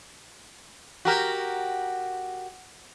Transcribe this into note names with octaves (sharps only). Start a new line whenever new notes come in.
F#4 G4 A#4